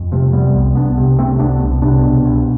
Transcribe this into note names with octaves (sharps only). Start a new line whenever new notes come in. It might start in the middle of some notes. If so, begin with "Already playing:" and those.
Already playing: F2
C3 F3 A3
C3 G3 B3
C2
C2 B3 D4
C3
C3 A3 C4
C2 B3 D4
C2
C3 B3 D4
B2
C2